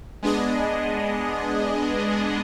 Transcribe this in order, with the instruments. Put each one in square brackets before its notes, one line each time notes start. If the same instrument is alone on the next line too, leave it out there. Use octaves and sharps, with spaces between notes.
[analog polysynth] G#3 B3 D4 G#4 D#5